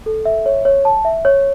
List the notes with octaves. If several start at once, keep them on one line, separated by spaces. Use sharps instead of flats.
A4
E5
C#5
C#5
A5
E5
C#5